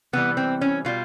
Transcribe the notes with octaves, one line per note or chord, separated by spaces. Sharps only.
C3 E3 G3 B3
C4
C#4
B2 G3 F4